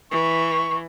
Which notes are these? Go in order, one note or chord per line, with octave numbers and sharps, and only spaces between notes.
E3 C#6